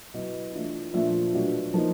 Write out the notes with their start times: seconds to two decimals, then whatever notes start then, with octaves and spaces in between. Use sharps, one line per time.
0.14 B2 F#3 B3 E4 D#5
0.53 E3 A3 D4 F4
0.93 A#2 F3 A3 D4 F4 E5
1.33 B2 F#3 A3 D4
1.74 F3 A#3 D#4